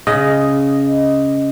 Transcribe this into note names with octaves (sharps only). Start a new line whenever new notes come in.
C#3 D#5